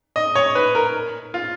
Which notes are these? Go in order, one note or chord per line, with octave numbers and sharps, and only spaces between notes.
D#5
C#5
B4
A#4
F4